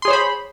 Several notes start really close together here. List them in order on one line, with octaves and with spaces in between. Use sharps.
C6 G#4 C#5 C5 B5